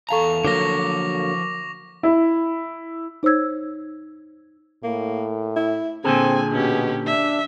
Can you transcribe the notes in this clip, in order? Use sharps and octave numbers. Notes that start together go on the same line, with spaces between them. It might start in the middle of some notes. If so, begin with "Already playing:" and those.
E2 A4 F5 A5 A#5 C#6 F7
D3 F3 F#3 A#3 F#4 D6 A#6
E4
D#4 C5 C#5 E6 G#6
A2 A#3
E4
A#2 D3 C4 G#4 A4 G#5
B2 C#4 G4
D4 E5